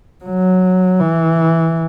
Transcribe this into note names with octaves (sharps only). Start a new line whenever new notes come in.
F#3
E3